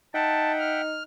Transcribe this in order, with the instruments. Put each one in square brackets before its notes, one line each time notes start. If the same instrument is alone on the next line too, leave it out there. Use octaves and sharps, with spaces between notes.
[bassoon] D#4 [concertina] E5 F#5 G5 [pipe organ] A5
[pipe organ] F6